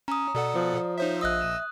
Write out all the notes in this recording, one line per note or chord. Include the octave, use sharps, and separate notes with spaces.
C#4 A#5 D#6
B2 A4 D5 F#5
F3
D#4 C5 C#5 E5
A#1 D#5 E5 D#6 E6 F#6